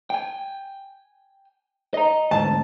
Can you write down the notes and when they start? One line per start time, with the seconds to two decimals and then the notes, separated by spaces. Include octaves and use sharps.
0.10 G5 G#5
1.94 D#5 A#5
2.31 D2 G#2 A5